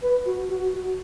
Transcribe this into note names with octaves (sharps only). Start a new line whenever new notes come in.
B4
F#4
F#4
F#4